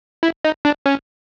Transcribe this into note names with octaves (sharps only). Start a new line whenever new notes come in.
E4
D#4
D4
C#4